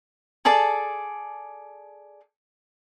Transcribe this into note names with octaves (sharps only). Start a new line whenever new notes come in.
G#4 A4 D5 A5